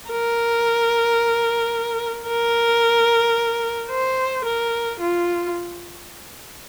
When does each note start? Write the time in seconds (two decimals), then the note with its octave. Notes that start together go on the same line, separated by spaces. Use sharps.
0.10 A#4
2.28 A#4
3.90 C5
4.45 A#4
5.00 F4